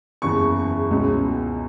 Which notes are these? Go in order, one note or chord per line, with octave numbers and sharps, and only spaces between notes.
F#1 E2 C#3 C#6
C#2 B2 G#3 C#4